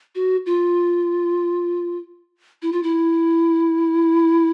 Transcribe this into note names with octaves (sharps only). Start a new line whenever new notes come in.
F#4
F4
E4
F4
E4